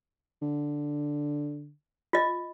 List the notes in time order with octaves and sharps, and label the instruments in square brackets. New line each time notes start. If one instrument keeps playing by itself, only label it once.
[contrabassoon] D3
[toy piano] F4 D#5